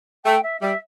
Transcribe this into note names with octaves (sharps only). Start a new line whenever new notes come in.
A3 G5
E5
G3 E5